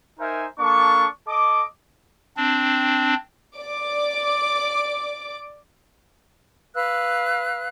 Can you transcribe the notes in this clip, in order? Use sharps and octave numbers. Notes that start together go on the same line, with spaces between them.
D#4 A#4 C5 E5 G#5
A#3 D4 A4 C#6
A4 D#5 D6
C4 D4
D5 D6
B4 F5 E6 F#6